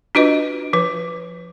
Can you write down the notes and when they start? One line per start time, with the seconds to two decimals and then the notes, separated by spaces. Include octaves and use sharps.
0.15 D4 F4 F#4 B4 D#5
0.73 F3 B4